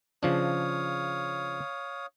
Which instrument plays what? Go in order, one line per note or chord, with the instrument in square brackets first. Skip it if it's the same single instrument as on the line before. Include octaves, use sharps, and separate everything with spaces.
[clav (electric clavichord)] C#3 F3 D4 [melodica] C#5 F5 D#6